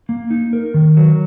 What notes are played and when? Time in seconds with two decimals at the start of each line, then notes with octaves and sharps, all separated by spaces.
0.09 A#3
0.30 D#4
0.53 A#4
0.74 D#3
0.97 F#3